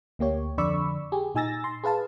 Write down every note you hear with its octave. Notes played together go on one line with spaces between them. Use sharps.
D2 A#3 G4 C#5
F2 D3 D5 B5 C#6 E6
G4 G#4
A#2 D#4 G#5 E6 A6 A#6
C6
G#4 B4 F5 A5